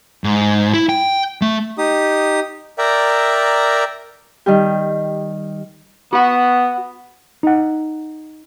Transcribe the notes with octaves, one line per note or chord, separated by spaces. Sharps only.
G#2
E4
G5
A3
D#4 G4 D#6
A#4 D5 E5 G5 A#5
D#3 G3 G4
B3 F#4 F#5
D#4 F#5